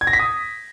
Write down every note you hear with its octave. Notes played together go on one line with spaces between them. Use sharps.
G#6
A#6
B6
D#6